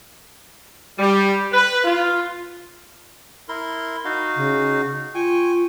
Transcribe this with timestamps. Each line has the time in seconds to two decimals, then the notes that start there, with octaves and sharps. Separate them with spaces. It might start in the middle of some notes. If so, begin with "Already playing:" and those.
0.99 G3
1.53 B4
1.84 F4
3.49 E4 A#4 C6
4.05 D#4 F#4 F5
4.36 C#3
5.15 F4 G5 G#5 C#6